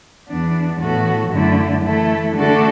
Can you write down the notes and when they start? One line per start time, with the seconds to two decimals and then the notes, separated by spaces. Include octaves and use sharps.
0.28 E2 E3 B3 D4
0.80 A2 E3 B3 F#4 A4
1.31 F#2 D3 A3 E4
1.84 E3 A3 E4 A4
2.36 D3 A3 D4 F#4 A4